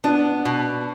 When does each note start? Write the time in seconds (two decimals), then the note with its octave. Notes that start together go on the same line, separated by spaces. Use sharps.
0.04 B3 D4
0.45 B2